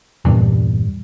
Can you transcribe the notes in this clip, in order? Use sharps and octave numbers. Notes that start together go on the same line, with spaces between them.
E2 G2 A#2